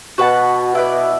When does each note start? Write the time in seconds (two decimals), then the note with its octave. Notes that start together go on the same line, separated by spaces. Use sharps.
0.18 B2 F#4 B4 F#5 A5
0.75 E4 B4 D5